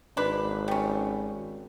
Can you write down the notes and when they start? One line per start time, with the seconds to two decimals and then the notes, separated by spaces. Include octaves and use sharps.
0.17 G#1 D4 B4
0.68 G3 C#4